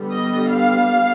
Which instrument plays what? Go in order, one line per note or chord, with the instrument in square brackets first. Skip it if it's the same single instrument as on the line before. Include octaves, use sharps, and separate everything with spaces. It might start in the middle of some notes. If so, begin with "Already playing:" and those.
Already playing: [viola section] D3 G3 B3
D#5
F5